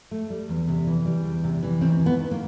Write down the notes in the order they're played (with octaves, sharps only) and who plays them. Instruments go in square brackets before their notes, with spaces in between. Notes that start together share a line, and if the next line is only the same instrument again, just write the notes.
[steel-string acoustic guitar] A3
G3
E2
C3
E3
G3
E2
C3
E3
D#2 C4
D#2
B3
D#3
A#3